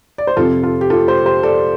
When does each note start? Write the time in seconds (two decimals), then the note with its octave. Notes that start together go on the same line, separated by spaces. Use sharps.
0.18 D5
0.27 C5
0.37 F2 C3 F3 F4 A4
0.63 F4 A4
0.81 G4
0.90 F4 A4
1.08 G4 C5
1.26 G4 C5
1.43 A4 D5